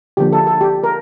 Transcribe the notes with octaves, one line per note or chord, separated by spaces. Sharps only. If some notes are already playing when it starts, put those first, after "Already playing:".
D3 F3 A#3 G4
A4
A4
G4
A#4